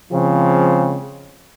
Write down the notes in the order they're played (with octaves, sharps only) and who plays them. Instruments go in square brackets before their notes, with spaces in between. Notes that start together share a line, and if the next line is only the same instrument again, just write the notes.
[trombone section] C#3 F3 G#3 C4